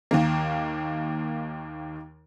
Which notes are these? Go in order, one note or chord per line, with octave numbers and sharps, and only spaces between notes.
D#2 D#3 A#3